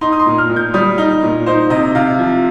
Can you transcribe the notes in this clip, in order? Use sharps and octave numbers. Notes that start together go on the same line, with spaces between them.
D#4 C6
D#6
C6
A#2
F6
A#2
G6
G3 D#6
D#4
A#2
D#4 C5
C3 D#5
C3 F5
F3